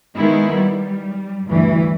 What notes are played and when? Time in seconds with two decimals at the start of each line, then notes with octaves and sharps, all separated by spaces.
0.16 D#3 G#3 B3 E4
0.55 G3
1.46 D2 G2 E3